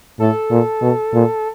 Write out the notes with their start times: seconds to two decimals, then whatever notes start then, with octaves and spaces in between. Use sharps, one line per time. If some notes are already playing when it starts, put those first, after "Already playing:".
0.20 A2 A4
0.51 A#2
0.82 B2
1.14 A#2